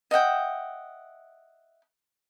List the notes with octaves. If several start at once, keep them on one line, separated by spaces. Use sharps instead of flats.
D#5 E5 F#5 G5